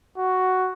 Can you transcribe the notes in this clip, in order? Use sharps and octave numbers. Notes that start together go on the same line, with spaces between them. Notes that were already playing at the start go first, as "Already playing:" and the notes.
F#4